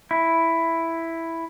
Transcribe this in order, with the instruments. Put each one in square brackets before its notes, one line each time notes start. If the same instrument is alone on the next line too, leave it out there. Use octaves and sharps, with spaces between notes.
[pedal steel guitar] E4